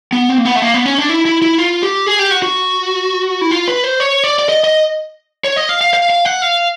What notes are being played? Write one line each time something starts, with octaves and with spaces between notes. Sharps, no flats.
B3
C4
A#3
B3
A3
A#3
B3
C#4
D4
E4
E4
E4
F4
G4
G#4
G4
F#4
F#4
E4
F4
B4
C5
C#5
D5
D5
D#5
D#5
C#5
D#5
F5
F5
F5
F5
F#5
F5